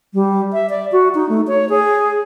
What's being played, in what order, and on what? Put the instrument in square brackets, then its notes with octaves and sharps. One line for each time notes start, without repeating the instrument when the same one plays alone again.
[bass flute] G3
E5
D5
F#4
D#4
A3
C#5
G#4